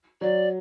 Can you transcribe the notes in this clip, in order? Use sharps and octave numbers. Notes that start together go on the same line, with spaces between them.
F#3 D5